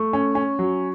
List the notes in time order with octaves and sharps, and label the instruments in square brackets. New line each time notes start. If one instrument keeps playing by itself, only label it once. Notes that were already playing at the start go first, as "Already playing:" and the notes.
Already playing: [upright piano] A3 [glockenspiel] C#6
[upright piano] C#4
C#4
F#3